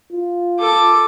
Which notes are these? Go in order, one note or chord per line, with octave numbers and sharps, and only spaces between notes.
F4
A4 D6